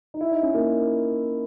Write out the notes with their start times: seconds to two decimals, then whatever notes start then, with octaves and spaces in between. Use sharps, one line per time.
0.14 D#4
0.21 E4
0.31 D#4
0.43 C#4
0.54 A#3